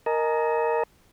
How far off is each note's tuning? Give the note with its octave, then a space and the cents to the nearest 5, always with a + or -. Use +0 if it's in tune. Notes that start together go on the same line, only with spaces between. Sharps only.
A#4 +0 D#5 +0 G#5 +45